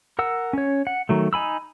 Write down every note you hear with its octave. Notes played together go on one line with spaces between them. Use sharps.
A#4 F#5 E6
C#4 C#5
F#5
D#3 F#3 A3
D#4 G#5 B5 E6